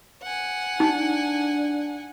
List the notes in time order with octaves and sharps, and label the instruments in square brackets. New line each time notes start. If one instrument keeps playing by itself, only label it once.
[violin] F#5 G#5
[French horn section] D4 [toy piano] D#4